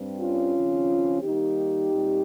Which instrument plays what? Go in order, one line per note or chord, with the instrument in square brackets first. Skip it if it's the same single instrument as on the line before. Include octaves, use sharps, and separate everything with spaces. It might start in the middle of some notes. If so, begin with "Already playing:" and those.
Already playing: [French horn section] G2 G3 C4
C#4 F4
D#2 C#3 F3 C4
D#2 D#3 G3 A#3 D#4 G4
A#2 G3 C4